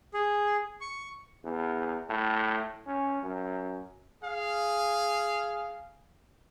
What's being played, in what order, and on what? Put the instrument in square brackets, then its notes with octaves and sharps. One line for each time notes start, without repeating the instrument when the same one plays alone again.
[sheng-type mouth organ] G#4
C#6
[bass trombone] E2
A2
C#4
F#2
[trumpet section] G#4 F5